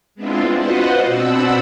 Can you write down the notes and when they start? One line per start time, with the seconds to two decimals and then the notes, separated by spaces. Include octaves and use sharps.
0.15 G#3 B3 C4 D4 E4 F4
0.55 F4 F#4 B4 C5 D#5 F#5
1.05 B2 C4 D4 F#5 B5 E6